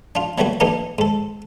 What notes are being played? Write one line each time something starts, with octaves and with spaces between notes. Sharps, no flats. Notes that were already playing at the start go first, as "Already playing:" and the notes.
D4 F4
F#3 G3 A3 A#3 F#4
E3 A3 A#3 D4 D#4 G4
G#2 A4